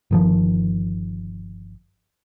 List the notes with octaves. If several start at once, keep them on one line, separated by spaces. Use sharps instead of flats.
G1 D#3 F3